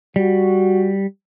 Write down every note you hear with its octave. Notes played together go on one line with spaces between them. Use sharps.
G3 F#4